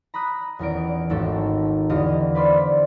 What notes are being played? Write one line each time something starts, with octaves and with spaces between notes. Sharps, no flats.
A#5 B5 D#6 F#6
D#1 E2 A#4 D7
G#1 D#2 A3 A4
E2 D3 G4 D#5 F5 D#7
B4 C5 D5 B5 C6 F6